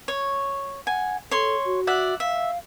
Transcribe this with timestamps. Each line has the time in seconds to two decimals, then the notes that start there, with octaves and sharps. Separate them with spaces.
0.08 C#5
0.87 F#5 G#5
1.31 A4 C#5 C6
1.66 F#4
1.87 D5 E5 F#5
2.20 E5 F5